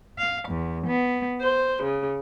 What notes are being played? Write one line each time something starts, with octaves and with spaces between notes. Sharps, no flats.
F5
E2
B3
C5
C#3